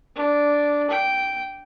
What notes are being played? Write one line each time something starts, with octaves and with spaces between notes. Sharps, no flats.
D4
G5